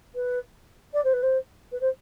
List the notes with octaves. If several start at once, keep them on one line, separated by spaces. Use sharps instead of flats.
B4
D5
C5
B4
C5
B4
C5